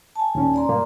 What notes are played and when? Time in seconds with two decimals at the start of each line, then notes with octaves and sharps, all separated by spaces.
0.16 G#5 A5
0.35 D#2 A#2 C#4
0.54 D5 A#5 C6
0.69 G2 A#2 A#3